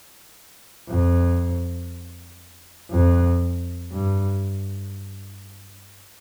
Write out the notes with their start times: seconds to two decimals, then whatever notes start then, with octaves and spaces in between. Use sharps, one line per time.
0.89 F2
2.91 F2
3.92 G2